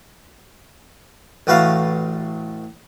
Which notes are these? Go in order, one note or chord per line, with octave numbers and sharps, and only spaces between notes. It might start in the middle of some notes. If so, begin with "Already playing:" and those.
A1 A3 F#4 B4 F5 A5